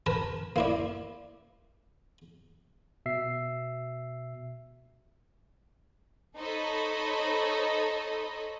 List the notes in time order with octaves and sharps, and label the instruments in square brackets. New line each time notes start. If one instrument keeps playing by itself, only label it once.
[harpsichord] A#4 B4 A5
A#3 E4 D5
[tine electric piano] B2 E5 C7
[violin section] D#4 A4 C5 C#5 D#5 B5